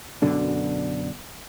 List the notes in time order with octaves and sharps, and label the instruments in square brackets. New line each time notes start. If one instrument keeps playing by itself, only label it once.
[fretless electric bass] F#2 B2 D3 D4